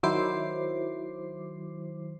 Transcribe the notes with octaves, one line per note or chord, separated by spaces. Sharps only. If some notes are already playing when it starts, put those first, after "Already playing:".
D#3 F#3 E4 C5 D6 C7